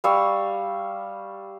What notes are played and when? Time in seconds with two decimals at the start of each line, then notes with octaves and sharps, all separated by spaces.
0.04 G3 F5 C#6 E6